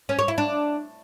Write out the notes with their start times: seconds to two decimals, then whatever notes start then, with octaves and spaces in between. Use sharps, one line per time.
0.09 C#4
0.19 C#5
0.28 E4
0.38 D4